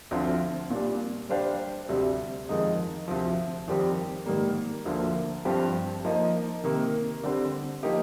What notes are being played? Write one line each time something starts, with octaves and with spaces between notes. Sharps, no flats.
D2 D3 F3 C4 F4
A#2 G3 D4
G3 D4 G4 C5 F5
D2 C3 G3
F2 D#3 G#3 D#4
D2 C3 F3
F2 D#3 G3 C4 G4
G#2 D#3 G3 A#3
D2 D3 F3 A#3
G2 F3 C4 G4
F3 A#3 D#4 A#4 D#5
C3 D#3 A#3
D3 G3 C4
F3 A#3 D#4 G4